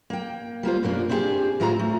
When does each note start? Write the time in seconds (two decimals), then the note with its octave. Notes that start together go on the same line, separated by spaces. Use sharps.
0.10 A#3 G5
0.63 G3 A#3 F4 C5
0.83 F#2 B2 A#3 D4
1.09 C4 D4 E4 F4 G4 G#4
1.60 A2 G#3 C4 F4 C5 A#5
1.79 A3